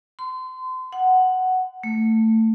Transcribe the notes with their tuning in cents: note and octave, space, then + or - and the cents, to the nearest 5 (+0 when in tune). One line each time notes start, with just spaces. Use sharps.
C6 -30
F#5 +5
A3 +20